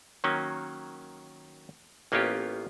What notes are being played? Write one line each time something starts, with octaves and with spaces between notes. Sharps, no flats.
D#3 F#3 A#3 C#4
A1 A#3 B3 C#4 F4 G4